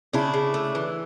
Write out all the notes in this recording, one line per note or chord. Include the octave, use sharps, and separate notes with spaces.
C#3 D4 E4
C#3
A3
E3